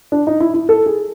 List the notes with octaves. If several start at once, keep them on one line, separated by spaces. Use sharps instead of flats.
D4
D#4
E4
E4
A4
G#4